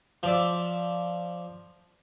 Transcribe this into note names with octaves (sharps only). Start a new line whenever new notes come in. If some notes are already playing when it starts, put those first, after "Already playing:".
F3 D5 E5